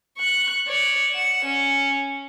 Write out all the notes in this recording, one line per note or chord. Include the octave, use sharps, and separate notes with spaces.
C#6 F#6
C#5 D5
F#5 E7
C#4